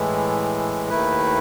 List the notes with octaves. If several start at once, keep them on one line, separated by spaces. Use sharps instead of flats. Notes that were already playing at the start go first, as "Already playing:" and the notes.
Already playing: A2 E3 G#3
D#2 D#3 A3 E4 B4